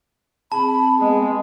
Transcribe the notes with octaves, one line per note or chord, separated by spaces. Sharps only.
C4 G#4 A5 B5
G#3 B3